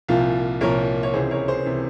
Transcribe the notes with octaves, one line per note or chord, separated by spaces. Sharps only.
C2 A#2 F3 F4
C2 A#2 F3 A#4 C#5
C#5
C#2 C3 E3 G#4 C5
A#4 C#5
G#4 C5
C3 E3